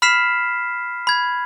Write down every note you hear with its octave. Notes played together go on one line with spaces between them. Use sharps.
B5 F6 B6 C7 E7
B5 G#6